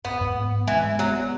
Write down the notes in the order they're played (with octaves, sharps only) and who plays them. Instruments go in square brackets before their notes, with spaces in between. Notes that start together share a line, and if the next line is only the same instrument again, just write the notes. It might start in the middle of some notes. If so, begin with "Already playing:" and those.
[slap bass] G#2 [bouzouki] B3
[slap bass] G#2
B3
B3
[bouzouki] E3 [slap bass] G#3
[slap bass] G#3
[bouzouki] F#3 [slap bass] B3
[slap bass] B3